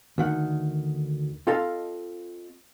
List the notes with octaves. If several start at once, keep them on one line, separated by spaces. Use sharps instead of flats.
D2 D#3 F#5
C4 F4 A4 D#5 F5 A5